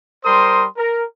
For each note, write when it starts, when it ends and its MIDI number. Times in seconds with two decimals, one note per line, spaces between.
0.25 0.65 55
0.25 0.65 70
0.25 0.65 72
0.25 0.65 84
0.25 0.65 87
0.77 1.04 70